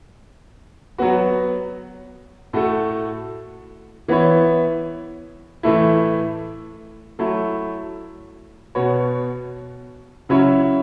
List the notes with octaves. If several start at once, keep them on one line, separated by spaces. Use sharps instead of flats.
F#3 B3 F#4
A2 A3 F#4 A4
E3 B3 E4 C#5
A2 E3 A3 E4
F#3 A3 E4
B2 B3 F#4 C#5
C#3 F#3 C#4 E4 C#5